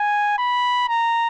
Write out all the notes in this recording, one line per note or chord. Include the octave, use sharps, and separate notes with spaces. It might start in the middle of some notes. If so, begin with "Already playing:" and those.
Already playing: G#5
B5
A#5